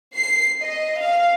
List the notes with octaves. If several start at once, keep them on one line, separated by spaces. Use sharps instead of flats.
C7
D#5
F5